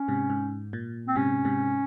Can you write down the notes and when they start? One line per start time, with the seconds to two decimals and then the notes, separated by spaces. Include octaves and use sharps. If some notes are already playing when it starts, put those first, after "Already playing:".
Already playing: C#4
0.08 G#2 C3
0.30 G#2
0.73 A#2
1.08 C4
1.16 G#2 C3 C#4
1.45 G#2 C3